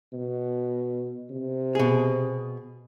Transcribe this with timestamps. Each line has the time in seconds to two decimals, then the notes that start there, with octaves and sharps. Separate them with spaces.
0.13 B2
1.30 C3
1.75 B2 G#4